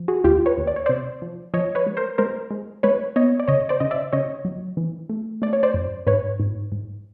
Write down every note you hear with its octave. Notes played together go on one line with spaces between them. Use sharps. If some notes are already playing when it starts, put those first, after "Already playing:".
Already playing: F3
F#4 G#4
D#2 F4 G4
B4 C#5
D#2
D5
C#5
C3 C5 D5
F3
F3 C#5 D#5
B4 C#5
G#3
A#4 C5
G#3 A#4 C5
G#3
G#3 B4 C#5
B3 C#5 D#5
D5
C#3 C#5 D#5
C5 D5
C#3 D#5
D5 E5
C#3 C#5 D#5
F#3
E3
A3
A3 D5
C#5
C5 D5
F#2
G#2 B4 C#5
G#2
G#2